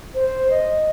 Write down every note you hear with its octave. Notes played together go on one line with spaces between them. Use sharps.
C5
D#5